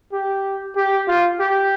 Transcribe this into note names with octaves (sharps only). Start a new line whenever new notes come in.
G4
G4
F4
G4